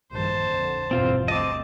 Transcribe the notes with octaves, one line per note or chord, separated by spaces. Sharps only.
A#1 G2 D#3 C5 A5
F2 D3
G1 E2 B2 C4 F4 C5
D2 C4 D#5 A5 D6